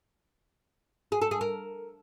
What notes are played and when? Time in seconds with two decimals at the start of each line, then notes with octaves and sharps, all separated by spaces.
1.12 G#4
1.22 A4
1.31 G#4
1.41 A#4